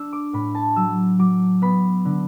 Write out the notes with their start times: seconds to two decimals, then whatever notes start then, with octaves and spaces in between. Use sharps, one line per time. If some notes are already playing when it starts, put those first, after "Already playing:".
Already playing: D4 E6
0.13 D6
0.33 A2 B5
0.55 A5
0.76 F#3 E6
1.19 F#3 D6
1.62 B3 B5
2.05 D3